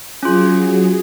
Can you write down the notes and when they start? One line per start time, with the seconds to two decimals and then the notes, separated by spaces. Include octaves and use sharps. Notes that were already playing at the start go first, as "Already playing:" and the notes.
0.23 F#3 C#4 F4 G#4